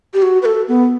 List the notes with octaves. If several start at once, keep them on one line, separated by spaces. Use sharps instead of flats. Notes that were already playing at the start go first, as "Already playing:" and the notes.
G4
F#4
B4
A4
B3